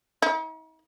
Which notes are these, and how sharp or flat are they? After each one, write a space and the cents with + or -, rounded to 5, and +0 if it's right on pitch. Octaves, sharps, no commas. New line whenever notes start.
D#4 +45